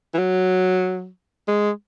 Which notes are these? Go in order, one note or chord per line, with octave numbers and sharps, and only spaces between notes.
E3
F#3
G#3